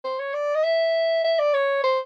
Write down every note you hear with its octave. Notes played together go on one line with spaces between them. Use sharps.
C5
C#5
D5
D#5
E5
E5
D5
C#5
C5